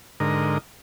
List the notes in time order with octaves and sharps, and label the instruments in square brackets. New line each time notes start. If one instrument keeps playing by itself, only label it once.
[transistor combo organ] G#2 D3 A#4 D#5